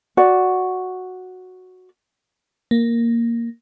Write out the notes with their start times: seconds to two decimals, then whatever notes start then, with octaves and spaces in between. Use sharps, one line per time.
0.17 F#4 D5
2.71 A#3